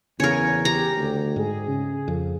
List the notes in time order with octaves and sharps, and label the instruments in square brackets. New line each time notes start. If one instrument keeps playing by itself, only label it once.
[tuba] E2 [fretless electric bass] C#3 [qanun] A#4 C#5 [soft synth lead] G#5
[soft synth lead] G4 [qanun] A#5
[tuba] D2
[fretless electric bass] G#2 [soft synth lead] G#4
[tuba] C#3
[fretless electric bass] F2